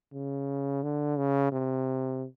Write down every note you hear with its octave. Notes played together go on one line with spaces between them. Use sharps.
C#3
D3
C#3
C3